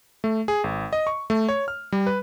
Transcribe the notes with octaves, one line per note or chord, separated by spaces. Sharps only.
A3
G#4
G#1
D#5
C#6
A3
C#5
F6
G3
B4